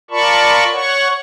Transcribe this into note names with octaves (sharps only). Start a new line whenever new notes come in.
F4 A#4 D5 A5 B5 C#6
C#5 F#5 C#6